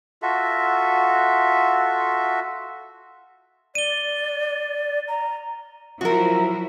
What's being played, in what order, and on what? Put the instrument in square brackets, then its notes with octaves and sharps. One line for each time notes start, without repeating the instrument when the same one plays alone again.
[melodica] F4 F#4 A4 E5
[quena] D5 [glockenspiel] D#7 G7
[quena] A#5
[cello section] F3 F#3 E4 [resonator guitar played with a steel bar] F#4 A#4